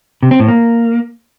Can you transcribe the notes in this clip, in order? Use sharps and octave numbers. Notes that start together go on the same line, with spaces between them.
C3
C4
A2
A#3